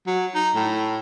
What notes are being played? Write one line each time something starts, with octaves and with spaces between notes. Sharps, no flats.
F#3
D#4
A2